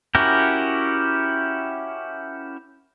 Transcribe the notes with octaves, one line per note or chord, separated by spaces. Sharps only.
C#4 E4 F#4 G4 A#4